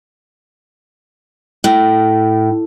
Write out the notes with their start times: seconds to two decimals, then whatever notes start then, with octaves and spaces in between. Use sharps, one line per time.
1.64 A2